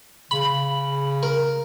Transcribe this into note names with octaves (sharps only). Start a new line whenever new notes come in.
C#3 B5
A#4